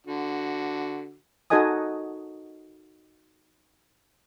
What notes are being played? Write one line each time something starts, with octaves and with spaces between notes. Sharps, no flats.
D3 F#4
D#4 F#4 A4 D#5 G#5 D#6